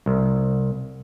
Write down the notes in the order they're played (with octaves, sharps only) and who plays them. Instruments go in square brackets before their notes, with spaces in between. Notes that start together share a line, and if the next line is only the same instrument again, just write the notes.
[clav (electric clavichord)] C2